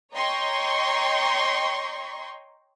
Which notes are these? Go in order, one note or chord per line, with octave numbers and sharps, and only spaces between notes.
C#5 D#5 G5 A#5 C6 C#6